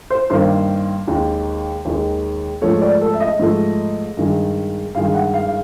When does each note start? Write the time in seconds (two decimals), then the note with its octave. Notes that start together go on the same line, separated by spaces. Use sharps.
0.10 C5
0.30 G2 D#3 G3 A#3 C5
1.07 D#2 D#3 G#3
1.85 D#2 D#3 G#3
2.62 G#2 F3 A3 C#5
2.82 D5
3.01 A4
3.13 E5
3.20 D#5
3.39 G#2 F3 A3
4.17 G2 D#3 G#3
4.95 G2 D#3 G#3 F5
5.15 F#5
5.34 F5
5.48 F5